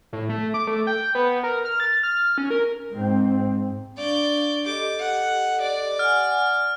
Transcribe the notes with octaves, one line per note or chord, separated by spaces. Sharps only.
A2
A3
D6
A3
G5
B3
A#4
F6
A6
F6
C#4
A#4
G#2 C4
D4 D5 F5 C#6 G6
G4 A4 D#5 D6
F#5
D5
F#5 G#5 F6